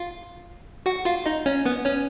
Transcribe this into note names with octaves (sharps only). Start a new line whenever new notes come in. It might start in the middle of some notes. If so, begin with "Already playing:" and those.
Already playing: F4 F5
F#4 F#5
F4 F5
D#4 D#5
C#4 C#5
B3 B4
C#4 C#5